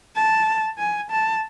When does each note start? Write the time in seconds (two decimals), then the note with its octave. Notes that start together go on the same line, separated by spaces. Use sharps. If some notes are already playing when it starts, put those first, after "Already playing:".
0.15 A5
0.78 G#5
1.10 A5